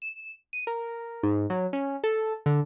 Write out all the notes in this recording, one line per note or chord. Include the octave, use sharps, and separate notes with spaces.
E7
D#7
A#4
G#2
F#3
C#4
A4
D3